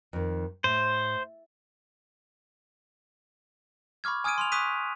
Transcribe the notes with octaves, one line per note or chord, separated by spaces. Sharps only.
F2 D#3
A2 C5
B5 C#6 D6 F6 G#6
G#5 D#6 F6 G#6 D7 D#7
C6 F6 F7
C#6 D#6 F#6 B6 D#7 F7